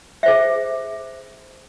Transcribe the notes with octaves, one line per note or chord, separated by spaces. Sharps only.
G#4 C5 E5